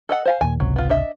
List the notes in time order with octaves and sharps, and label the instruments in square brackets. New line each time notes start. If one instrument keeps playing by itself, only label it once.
[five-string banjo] A4 D#5 F#5
C5 F5 G#5
[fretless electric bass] D#2 A#2 [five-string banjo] G#5
[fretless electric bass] G#1 C#2 C3 [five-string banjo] F#3
[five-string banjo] B3 F4
D4 D#5 E5